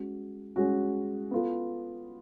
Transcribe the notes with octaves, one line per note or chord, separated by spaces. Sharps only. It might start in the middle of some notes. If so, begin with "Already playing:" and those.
Already playing: G#3 C#4 F#4
G#3 C#4 F#4
B3 F4 A4